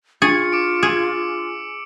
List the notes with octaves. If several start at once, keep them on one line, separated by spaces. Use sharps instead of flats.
D4 F4 G#4 C#6 A6 C#7
D6 D7
G#4 E6